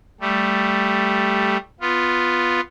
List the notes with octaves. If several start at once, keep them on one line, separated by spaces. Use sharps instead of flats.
G3 A3
B3 F4